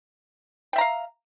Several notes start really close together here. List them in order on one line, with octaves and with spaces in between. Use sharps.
G5 E5 A#5 F5